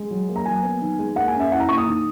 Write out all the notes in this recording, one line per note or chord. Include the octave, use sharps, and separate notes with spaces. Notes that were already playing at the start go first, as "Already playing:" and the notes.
Already playing: G#3
F#3
A#3
A#5
F#3 G#5
B3
D#3
G#3
A#3 F#5
G#5
C#4
E5
E4 F#5
A#5
A#2 C#6
D#6
D#3